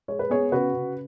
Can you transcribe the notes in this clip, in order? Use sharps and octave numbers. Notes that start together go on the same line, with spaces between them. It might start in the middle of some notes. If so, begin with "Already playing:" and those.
G#3 C#5
B4
B3 G#4 C#5
C#3 F#4 B4
C#3